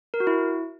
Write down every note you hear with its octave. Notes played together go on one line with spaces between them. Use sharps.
A#4
F#4
E4